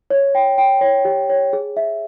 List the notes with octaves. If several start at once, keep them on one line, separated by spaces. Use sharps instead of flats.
C#5
G5
G5
C#5
G4
C#5
G#4
E5